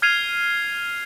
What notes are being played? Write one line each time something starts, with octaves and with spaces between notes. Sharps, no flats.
F6 G#6 C7 D#7 F7